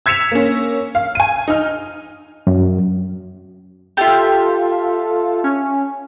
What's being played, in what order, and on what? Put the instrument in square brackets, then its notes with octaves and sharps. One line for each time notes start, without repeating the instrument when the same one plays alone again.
[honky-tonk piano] E6 G#6 B6 C#7 E7 F7
A#3 C#4
F5
G#5 D#7
D#4 F6
[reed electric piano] F#2
[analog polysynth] F4 A4 [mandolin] G4 E5
[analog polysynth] C#4